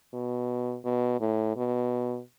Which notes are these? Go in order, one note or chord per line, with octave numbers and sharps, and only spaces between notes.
B2
B2
A2
B2